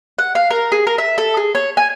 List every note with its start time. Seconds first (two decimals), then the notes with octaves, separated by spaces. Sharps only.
0.19 F#5
0.35 F5
0.50 A#4
0.72 G#4
0.87 A#4
0.98 E5
1.18 A4
1.37 G#4
1.55 C#5
1.77 G#5